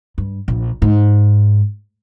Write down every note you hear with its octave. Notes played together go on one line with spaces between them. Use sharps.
G2
A#1
G#2